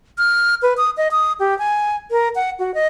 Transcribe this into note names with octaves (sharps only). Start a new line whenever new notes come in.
F6
B4
D#6
D#5
D#6
G4
G#5
A#4
F#5
F#4
D#5